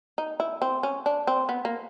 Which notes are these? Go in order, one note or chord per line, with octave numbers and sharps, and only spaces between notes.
D#4
E4
C4
C#4
D4
C4
B3
A#3